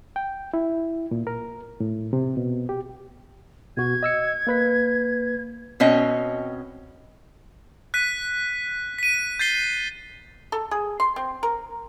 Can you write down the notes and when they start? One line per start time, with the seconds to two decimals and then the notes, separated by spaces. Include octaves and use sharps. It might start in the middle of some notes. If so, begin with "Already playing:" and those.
0.16 G5
0.54 E4
1.11 A#2
1.27 A#4
1.80 A2
2.13 C3
2.37 B2
2.69 G4
3.77 B2 F#4 G#6
4.03 D#5 E6 C#7
4.47 A#3 B4 B6
5.80 B2 C4 C#4 D#5
7.94 F#6 B6 D#7
8.98 B6 D#7
9.39 G6 A6 C7 G7
10.52 A4
10.71 G#4
11.00 C6
11.16 C4
11.43 A#4